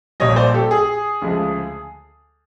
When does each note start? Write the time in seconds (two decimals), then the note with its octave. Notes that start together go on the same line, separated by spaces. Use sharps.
0.20 A#1 A#2 G3 C#5 D#5
0.36 C5 D5
0.54 G4 A4
0.71 G#4
1.22 D2 C#3 F3 G#3